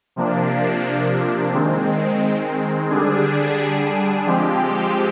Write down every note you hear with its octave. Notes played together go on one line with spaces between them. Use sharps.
C3 F3 A#3 D4
D#3 G#3 C4
D3 G3 D4 G#4
F3 G#3 C4 G4